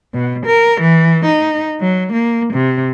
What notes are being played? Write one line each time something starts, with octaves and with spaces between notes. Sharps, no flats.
B2
A#4
E3
D#4
F#3
A#3
C3